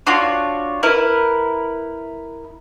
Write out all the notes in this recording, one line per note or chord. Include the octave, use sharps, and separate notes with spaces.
D4 F4 F#4 C#5
E4 A#4 B4